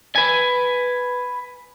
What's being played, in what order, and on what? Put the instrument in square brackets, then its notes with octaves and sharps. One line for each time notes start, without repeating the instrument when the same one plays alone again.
[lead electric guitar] B4 G#5